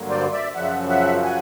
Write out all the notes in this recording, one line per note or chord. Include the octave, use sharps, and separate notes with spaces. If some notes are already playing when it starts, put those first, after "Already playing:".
Already playing: G2 D3 F#3 A#3
C5 D5
D5 E5
F#2 C#3 F3 E5 F#5
E5 F#5
F#5 G#5